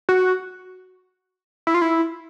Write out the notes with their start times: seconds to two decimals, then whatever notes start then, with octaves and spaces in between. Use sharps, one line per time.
0.09 F#4
1.67 E4
1.74 F4
1.82 E4